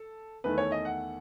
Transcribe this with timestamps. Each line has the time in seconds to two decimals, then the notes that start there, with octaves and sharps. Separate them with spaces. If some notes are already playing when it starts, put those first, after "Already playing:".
Already playing: A4
0.44 E2 D#3 A3 B4
0.58 C#5
0.72 D#5
0.85 F#5